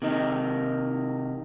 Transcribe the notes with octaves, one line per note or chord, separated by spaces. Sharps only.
C3 D#3 D#4